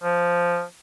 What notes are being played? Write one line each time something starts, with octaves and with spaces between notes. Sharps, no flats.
F3